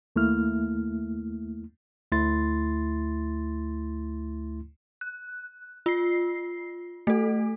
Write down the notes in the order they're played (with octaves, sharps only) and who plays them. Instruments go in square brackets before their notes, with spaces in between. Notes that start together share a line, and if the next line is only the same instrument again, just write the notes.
[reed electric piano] D#2 A3 A#3 E4 F6
[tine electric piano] D2 A3 E4 C6 A6
[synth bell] F#6
F4 C7
A3 A4